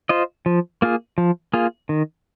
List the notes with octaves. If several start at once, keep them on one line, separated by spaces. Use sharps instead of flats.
F4 C5 D#5
F3
A#3 F4 G#4
F3
A#3 F4 G#4
D#3